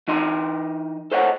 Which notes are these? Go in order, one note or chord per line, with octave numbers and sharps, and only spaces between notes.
E3 D#4 D#5 C6
A4 C5 C#5 D#5 F#5